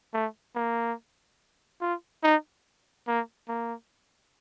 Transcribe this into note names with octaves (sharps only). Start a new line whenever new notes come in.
A3
A#3
F4
D#4
A#3
A#3